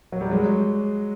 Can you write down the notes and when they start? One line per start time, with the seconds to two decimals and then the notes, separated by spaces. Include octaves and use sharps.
0.12 F#3
0.21 G3
0.30 F#3 G#3